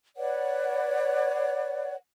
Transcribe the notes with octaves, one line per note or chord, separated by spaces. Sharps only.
B4 C#5 D5 F#5